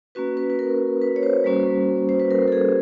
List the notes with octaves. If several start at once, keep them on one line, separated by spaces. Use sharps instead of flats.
A#3 C#4 F#4 B4
B4
B4
A#4
B4
C#5
C5
G3 A#3 C#4 F#4
C5
B4
A#4
A4
G#4